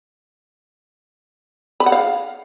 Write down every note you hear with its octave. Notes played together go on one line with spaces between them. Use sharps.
B5
F#5
F5